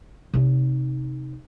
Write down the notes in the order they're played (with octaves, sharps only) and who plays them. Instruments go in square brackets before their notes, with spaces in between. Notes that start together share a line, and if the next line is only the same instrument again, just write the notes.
[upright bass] C3 D#4